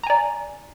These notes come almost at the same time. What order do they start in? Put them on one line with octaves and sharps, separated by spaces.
A#5 G#5 D5